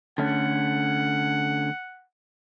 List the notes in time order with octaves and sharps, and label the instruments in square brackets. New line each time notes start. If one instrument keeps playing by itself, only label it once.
[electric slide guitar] D3 A3 C#4 [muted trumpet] F#5